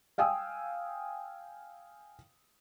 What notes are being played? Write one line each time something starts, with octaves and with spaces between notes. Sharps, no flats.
F5 G5 G#5 D#6 E6